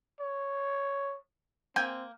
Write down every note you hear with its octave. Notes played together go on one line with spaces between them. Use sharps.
C#5
A#3 C4 G5 G#5